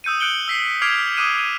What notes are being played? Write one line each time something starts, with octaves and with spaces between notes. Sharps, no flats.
D#6 E6 G6 C#7 D#7
F#6 G6 C#7 D7 F#7 G7
E6 B6 C7
D6 F6 G#6 C7 D7 F7
D6 D#6 F#6 D#7 E7
D#7